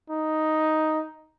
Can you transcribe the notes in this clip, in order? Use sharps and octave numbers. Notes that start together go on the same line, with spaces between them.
D#4